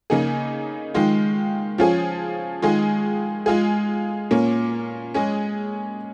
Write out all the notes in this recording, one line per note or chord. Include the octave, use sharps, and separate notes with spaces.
C#3 A#3 D#4 G#4
D#3 G#3 F4
F3 C#4 F4 G#4
D#3 G#3 F4 G#4
G#3 F4 G#4
A#2 A#3 C#4
G#3 C#4 G#4